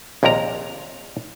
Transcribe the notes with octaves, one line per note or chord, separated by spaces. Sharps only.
A#1 D#2 C3 A#4 A#5